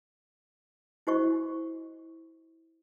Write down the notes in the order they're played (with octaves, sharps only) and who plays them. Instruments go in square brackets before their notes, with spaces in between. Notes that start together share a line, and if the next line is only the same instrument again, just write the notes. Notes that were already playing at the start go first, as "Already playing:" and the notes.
[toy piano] E4 F#4 C5 D#5 C#6